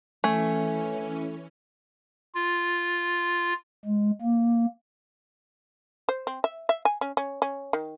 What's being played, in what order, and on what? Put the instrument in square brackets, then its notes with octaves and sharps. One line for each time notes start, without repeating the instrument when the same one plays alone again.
[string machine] E3 C#4 [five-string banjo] A3 [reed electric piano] G#5
[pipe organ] F4
G#3
A#3
[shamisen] C5
C4
E5
E5
G#5
C#4
C#4
C#4
D#3